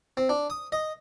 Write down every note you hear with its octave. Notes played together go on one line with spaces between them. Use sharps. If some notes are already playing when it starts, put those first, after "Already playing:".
C4
D4
D#6
D#5